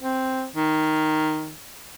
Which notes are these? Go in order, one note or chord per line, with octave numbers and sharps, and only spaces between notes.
C4
D#3